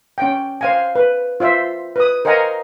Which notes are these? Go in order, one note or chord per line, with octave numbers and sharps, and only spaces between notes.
C#4 F#5 G5
C5 F5 G#5
B4
F4 C5 E5
B4 D#6
A#4 C5 D#5 F#5 G#5 A#5